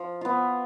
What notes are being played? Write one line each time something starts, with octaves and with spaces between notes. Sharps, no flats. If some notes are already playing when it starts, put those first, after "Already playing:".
Already playing: F3
B3 F4